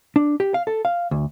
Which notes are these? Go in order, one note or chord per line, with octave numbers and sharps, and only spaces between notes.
D4
G4
F5
A4
F5
D2